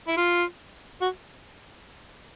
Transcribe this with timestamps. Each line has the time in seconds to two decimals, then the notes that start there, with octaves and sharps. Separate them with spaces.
0.08 E4
0.18 F4
1.02 F#4